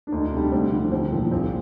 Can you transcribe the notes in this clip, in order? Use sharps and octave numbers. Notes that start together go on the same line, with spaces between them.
D4
D2 D#4
C3 G3 D4
D2 C4
D3 F3
C2 C4
A#2 F3
A#1 C4